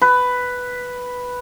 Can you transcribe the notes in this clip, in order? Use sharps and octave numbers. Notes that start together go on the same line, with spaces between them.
B4